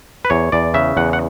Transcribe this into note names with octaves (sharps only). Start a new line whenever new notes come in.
B4
E2 C#5
E2 D5
C#3 E5
E2 F#5
F#5